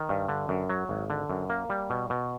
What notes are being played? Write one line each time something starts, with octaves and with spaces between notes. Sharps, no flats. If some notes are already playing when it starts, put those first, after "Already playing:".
Already playing: D#3
G2
D3
F#2
F#3
G#1
D3
F#2
A#3
G3
B2
B2